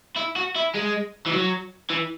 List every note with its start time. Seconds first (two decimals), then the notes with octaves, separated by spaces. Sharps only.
0.16 E4
0.36 F#4
0.55 E4
0.75 G#3
1.26 E3
1.32 F#3
1.90 E3